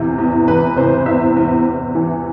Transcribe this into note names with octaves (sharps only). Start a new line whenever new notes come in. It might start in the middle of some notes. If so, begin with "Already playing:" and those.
Already playing: E2 C3 E3
E2
E3 B4
C3 C5
E2 E5
E2
E2
E3